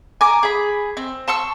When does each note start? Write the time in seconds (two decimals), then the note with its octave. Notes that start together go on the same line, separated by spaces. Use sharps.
0.21 G#5 A#5 D6
0.43 G#4 B5
0.97 C4
1.28 A5 C6 C#6 E6